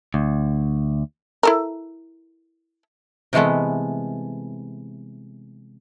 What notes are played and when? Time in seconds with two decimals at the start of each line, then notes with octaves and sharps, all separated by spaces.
0.14 D2
1.43 E4 A4 A#4
3.33 C3 E3 G#3 A3 B3